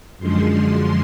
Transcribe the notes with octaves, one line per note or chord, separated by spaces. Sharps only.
F#2 D3 F3 G#3 C6